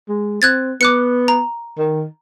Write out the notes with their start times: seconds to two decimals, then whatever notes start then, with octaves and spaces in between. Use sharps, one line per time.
0.08 G#3
0.42 C4 F#6 G#6 A6
0.81 B3 D6 F#6 C#7
1.28 A#5
1.78 D#3